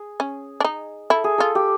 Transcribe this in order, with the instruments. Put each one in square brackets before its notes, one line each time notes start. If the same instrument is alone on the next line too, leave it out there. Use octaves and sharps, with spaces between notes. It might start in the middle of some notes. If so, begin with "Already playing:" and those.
Already playing: [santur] G#4
[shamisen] C#4
D4
D#4
[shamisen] E4 [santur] A4
[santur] G#4
[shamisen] F4 [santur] A4
[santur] G4